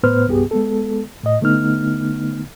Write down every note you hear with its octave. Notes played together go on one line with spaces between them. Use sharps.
A2 B3 B4 C5 F6
C2 G2 B3 G4 G#4
G#3 B3 A4
A2 D#5
D3 A3 B3 D#4 F6